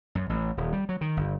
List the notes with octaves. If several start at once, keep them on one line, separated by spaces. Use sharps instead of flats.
F#2
A1
D#1
G3
F#3
D#3
G1